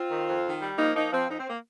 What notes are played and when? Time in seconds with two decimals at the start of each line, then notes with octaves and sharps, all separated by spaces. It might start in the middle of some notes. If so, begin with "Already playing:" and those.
Already playing: C4 F4
0.10 D#3
0.27 F2
0.44 D#3
0.61 G3
0.77 F3 A#3 D#4
0.95 F3 A#3 D#4
1.12 F3 C4
1.29 F2 D#4
1.39 C4
1.48 A#3